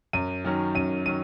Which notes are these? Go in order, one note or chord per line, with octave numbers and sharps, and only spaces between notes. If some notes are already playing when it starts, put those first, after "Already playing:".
F#2 D#7
D#3 F#3 C#4
F#2 D#7
D#3 F#3 D#7